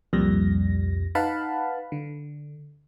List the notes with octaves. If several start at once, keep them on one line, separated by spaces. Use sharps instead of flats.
C2 F2 A#2 G3 A#6
D#4 B4 F5 F#5 A5 B5
D3